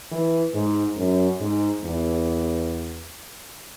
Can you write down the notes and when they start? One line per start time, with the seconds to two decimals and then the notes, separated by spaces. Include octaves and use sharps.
0.11 E3
0.54 G#2
0.97 F#2
1.40 G#2
1.84 E2